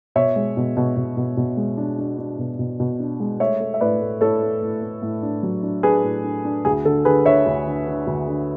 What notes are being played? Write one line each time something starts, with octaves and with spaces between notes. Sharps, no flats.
B2 C#5 E5
G#3
B2
B2
B2
B2
B2
G#3
D4
D4
D4
B2
B2
B2
D4
G#3
A3 C#5 E5
A3
E5
A2 B4 D5
A3
A2 A4 C#5
A3
A2
A3
A2
D4
F#3
D4
D4 G#4 B4
A2
D4
D4
D2 G#4
D3 A4
D3 G#4 B4
D3 C#5 E5
D2
D3
D3
D2
D3